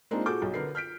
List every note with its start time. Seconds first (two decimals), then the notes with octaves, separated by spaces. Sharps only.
0.11 G#3 A#3 C4 D4 D#4 F4
0.26 A#2 F#4 G#4 A4 D6 G6
0.42 B1
0.54 D3 A#4 B4 C7
0.75 F6 G6 B6 D7